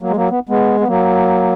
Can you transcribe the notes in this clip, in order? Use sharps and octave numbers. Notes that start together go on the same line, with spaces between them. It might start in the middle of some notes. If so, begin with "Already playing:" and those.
F#3 A#3
G#3
F#3 A#3
B3
G#3 B3
B3
F#3 A#3